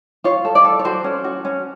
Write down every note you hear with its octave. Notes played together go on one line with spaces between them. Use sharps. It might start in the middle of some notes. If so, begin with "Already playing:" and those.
F4 C#5
A4
D5
A4
C#5
F#4 C5
C#4
F#4
C#4